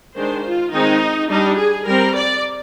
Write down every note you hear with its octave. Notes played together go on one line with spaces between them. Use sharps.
D#3 G#3 D4 C5
F4
D#3 G#3 C4 D#4
G3 D4 D#4
G#4
G3 C4 A#4
D5